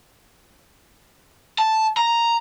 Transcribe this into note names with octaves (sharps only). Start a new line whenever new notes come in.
A5
A#5